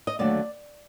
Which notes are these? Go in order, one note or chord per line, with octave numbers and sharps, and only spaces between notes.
D#5
D#2 D3 F#3 A3 D5